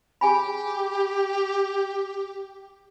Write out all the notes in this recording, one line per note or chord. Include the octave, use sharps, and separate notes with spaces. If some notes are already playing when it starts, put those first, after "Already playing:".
G4 G#4 G#5 B5